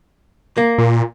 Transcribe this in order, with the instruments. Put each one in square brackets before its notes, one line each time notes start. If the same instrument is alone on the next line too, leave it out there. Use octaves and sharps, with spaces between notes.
[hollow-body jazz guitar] A#3
[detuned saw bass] A#2